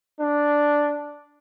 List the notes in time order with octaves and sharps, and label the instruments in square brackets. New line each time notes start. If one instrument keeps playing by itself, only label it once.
[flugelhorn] D4